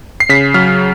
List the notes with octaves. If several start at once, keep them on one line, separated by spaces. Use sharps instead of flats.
C7
C#3 B6
F#3 F6